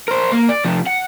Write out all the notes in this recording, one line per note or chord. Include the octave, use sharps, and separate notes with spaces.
A#4 C5
A#3
D5
C3 F3
F#5